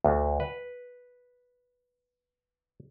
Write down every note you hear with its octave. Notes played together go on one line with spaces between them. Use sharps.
D2
B4